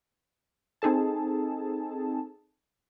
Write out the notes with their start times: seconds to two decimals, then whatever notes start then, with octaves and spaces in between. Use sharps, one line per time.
0.82 C4 D#4 G#4 A4 A5